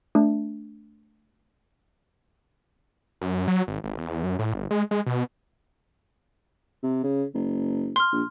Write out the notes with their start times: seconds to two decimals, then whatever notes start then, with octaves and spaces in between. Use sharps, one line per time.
0.15 A3 D4
3.22 F#2
3.48 F#3
3.67 G#1
3.84 G#1
3.98 E2
4.23 F#2
4.39 A2
4.54 G1
4.71 G#3
4.91 G#3
5.06 B2
6.83 C3
7.04 C#3
7.34 F#1
7.96 C6 F6
8.12 A#1